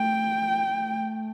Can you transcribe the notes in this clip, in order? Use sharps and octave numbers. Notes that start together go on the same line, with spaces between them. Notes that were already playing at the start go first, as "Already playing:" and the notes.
Already playing: A3 G5
A3